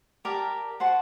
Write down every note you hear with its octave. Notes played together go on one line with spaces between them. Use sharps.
G4 A#4 D5 A5
F#4 C5 F#5 A5